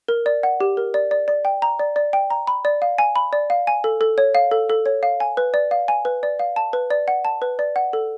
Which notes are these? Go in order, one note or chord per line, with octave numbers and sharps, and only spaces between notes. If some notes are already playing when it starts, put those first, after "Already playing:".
A#4
D5
F#5
G4
A#4
D5
D5
D5
G5
A#5
D5
D5
G5
A#5
B5
D5
F5
G#5
B5
D5
F5
G#5
A4
A4
C#5
F5
A4
A4
C#5
F5
G#5
B4
D5
F5
G#5
B4
D5
F5
A5
B4
D5
F#5
A5
B4
D5
F#5
A4